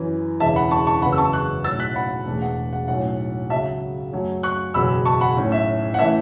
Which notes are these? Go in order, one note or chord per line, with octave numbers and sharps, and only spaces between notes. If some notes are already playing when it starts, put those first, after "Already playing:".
Already playing: F#2 E3 C#4
E1 E2 C#3 E3 C#4 E5 A5
F#5 B5
A5 C#6
A5 C#6
F#1 E2 C#3 F#3 B3 F#5 B5
E6
A5 C#6
C#6 F#6
B1 A2 F#3 E6 A6
F#6 B6
F#5 B5
E1 E2 B2 A3
F#5
F#5
B1 A2 F#3 C#4 F#5
C#2 C#3 F#3 E5 A5
F#2 F#3 A3 C#4
C#6 F#6
F#1 E2 B2 F#3 C#4 B5 E6
A5 C#6
F#5 B5
B1 A2 A3 C#4
E5
F#5
A2 E3 A3 C#4 E5